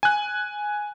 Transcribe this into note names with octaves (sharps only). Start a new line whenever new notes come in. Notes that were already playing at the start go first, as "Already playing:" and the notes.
G#5 F#6